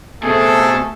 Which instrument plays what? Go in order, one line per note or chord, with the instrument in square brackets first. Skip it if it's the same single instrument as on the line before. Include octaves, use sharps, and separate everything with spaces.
[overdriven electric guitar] B2 C4 [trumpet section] A3 [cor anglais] G#4 [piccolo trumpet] A4